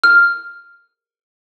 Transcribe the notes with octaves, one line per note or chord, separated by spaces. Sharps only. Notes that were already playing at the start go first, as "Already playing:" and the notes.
F6